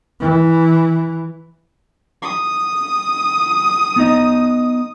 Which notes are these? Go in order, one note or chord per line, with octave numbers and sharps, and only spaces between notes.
E3
D#6
B3 D#4 D#5